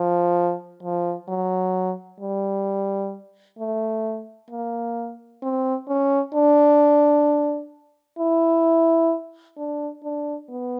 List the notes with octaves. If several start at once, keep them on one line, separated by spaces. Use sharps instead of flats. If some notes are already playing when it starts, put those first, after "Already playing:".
Already playing: F3
F3
F#3
G3
A3
A#3
C4
C#4
D4
E4
D4
D4
B3